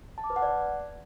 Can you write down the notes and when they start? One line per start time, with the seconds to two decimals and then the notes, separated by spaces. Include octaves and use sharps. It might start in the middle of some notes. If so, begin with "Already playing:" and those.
0.18 A5
0.24 D6
0.30 B4
0.36 F#5
0.42 D5